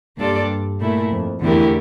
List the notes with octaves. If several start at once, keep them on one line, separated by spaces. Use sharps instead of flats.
G2 A#3 D4 F4 A4 D5
A#2 A3 E4 A#4
F2
E2 D3 A3 E4 G4 A#4